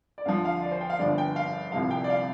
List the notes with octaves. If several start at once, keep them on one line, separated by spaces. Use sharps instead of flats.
D5
D2 D3 F3 F5
F5
D5
C5
G5
F5
G1 G2 D3 F3 D5
G5
F5
C2 C3 F3 F5
G5
D5
F5